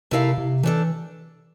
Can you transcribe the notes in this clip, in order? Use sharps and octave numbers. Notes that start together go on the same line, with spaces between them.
C3 A3 E4 A#4 F5
C3
E3 A3 D4 A4